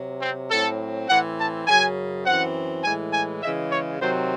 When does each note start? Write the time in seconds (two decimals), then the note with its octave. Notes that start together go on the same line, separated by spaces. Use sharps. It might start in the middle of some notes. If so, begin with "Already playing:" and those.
Already playing: C3 F#3
0.22 C4
0.51 A2 F#3 C4 A4
1.09 A2 E3 C4 F#5
1.39 A5
1.67 F#2 C#3 F#3 G#5
2.26 F#2 E3 C4 F#5
2.84 A2 E3 G#3 G#5
3.13 G#5
3.43 C#3 E3 G#3 E5
3.72 C#5
4.01 C3 D#3 F#3 C4 C5